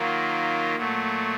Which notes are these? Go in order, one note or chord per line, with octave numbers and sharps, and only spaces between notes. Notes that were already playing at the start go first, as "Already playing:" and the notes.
Already playing: D#3 F#3 A#3 F4
A#2 F#3 A3